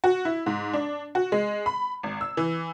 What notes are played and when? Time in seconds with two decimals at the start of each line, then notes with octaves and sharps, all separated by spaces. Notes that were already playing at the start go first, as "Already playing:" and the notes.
0.04 F#4
0.25 E4
0.46 G#2
0.73 D4
1.15 F#4
1.32 G#3
1.66 B5
2.03 G#1
2.21 E6
2.37 E3